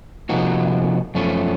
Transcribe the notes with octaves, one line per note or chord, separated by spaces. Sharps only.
C3 F3 A#3 D#4 F#4
F#2 F3 A3 C#4